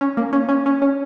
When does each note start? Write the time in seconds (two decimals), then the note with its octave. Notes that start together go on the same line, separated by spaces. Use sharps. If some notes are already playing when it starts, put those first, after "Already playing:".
0.01 C#4
0.17 A#3
0.33 C#4
0.49 C#4
0.66 C#4
0.82 C#4